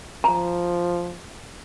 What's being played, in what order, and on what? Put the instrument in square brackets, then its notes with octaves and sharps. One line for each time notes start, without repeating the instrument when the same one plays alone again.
[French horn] F3 [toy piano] A#5